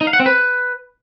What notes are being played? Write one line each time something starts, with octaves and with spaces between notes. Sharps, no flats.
D#4
F5
F#5
C4
B4